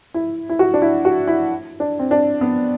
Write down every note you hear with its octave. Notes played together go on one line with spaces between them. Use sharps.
E4
E4
F#4
D4
E4
F#4
E4
D4
C4
D4
B3